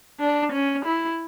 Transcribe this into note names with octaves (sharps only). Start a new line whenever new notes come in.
D4
C#4
E4